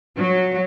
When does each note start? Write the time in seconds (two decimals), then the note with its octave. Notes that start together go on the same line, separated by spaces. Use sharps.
0.19 F#3